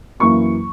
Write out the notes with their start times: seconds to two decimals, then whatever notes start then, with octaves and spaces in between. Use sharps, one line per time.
0.20 F#2 E3 A#3 E4 C#6